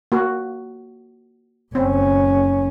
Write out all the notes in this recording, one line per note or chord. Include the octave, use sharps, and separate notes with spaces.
A#3 F#4
F#1 C4 C#4